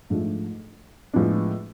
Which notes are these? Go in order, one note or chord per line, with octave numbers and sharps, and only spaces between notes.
G#2 F3 A3 D4
A2 F3 G#3 B3 D4